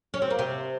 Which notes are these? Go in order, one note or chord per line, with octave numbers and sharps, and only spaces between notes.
C#4
C4
A#3
C3 C4